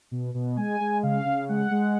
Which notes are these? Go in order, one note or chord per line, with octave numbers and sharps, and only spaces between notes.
B2
B2
G#3 G#5
G#3
C#3 F5
C#3
G#3 F#5
G#3